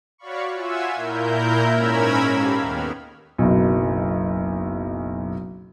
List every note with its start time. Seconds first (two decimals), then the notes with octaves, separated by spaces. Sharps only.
0.18 F#4 C#5 D5 F5 B5 C#6
0.53 F4 E5 F#5 G#5 E6 G#6
0.95 A#2 E4 A#4 G6
1.70 G#2 C#4 A#4 B5 E6 G#6
2.29 G4 A4 F5
2.59 D#2 D#3 B3 F6
3.38 F#1 B1